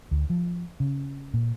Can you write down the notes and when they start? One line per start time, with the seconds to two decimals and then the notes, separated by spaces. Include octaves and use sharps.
0.11 D2
0.30 F3
0.80 C#3
1.34 A#2